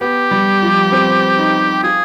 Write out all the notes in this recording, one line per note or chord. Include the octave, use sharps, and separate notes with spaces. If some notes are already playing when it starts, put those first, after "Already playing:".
B3 G4
G3
F3
C4
D#4
F4 G#4